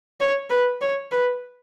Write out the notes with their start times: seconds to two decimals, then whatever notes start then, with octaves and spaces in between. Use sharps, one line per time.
0.20 C#5
0.50 B4
0.81 C#5
1.12 B4